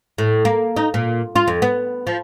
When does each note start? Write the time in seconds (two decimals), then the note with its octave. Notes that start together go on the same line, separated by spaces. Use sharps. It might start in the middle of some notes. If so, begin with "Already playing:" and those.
0.18 A2
0.45 A#3
0.76 D#4
0.94 A#2
1.36 F4
1.48 F2
1.62 B3
2.07 F3